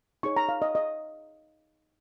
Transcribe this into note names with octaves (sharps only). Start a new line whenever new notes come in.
D#4 G#4 C#5 C#6
A#5
F5
D#5
D#5